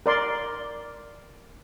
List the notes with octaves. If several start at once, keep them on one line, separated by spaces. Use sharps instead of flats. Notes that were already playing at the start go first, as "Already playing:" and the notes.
A#4 D5 C6